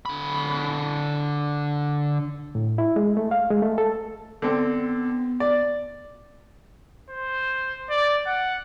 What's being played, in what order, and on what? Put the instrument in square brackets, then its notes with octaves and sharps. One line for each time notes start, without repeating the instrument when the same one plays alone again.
[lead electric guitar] D3 B5
[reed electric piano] A2
E4
G#3
A3
F5
G#3
A3
A4
[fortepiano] D3 C4 [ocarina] B3
[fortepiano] D5
[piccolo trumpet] C5
D5
F#5